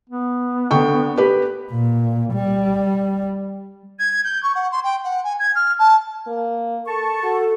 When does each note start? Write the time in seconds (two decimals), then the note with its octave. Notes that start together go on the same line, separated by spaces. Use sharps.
0.09 B3
0.71 D3 G5 C#6
1.17 G4 B4
1.72 A#2
2.33 G3
3.99 G#6
4.24 G6
4.42 C#6
4.54 F#5
4.71 C6
4.83 G5
5.03 F#5
5.24 G#5
5.39 G#6
5.55 F6
5.78 A5
6.27 A#3
6.88 A4 A5 C#6
7.23 F#4 A4